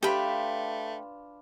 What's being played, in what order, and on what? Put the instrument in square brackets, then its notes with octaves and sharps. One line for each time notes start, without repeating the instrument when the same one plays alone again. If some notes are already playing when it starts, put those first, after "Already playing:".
[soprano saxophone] A3 [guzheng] D4 F4 B4 [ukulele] G4 [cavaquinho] G5 B5